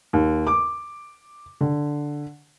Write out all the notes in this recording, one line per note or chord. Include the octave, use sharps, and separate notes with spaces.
D#2
D6
D3